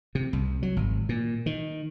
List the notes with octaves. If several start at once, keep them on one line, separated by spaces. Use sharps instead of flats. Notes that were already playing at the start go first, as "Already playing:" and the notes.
C3
C2
F#3
G#1
A#2
D#3